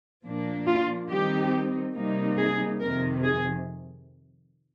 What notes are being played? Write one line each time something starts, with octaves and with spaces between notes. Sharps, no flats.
A#2 F3 A#3 D4
F4
D#3 G3 C4 D#4 G4
C3 G3 A#3 D#4
G#4
F2 C3 D#3 A#4
G#4